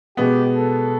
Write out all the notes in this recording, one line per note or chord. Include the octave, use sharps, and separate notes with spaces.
B2 G#3 B3 G4
A4